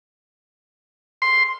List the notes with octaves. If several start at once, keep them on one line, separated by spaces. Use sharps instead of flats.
C6